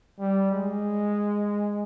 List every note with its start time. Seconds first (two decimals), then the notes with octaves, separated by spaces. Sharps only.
0.19 G3
0.51 G#3